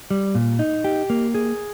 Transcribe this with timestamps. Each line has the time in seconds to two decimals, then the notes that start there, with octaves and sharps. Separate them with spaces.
0.11 G3
0.35 A#2
0.59 D#4
0.84 G4
1.10 A#3
1.34 G#4